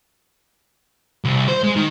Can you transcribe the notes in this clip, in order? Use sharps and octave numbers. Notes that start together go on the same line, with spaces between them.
C2
C5
G#3
D#3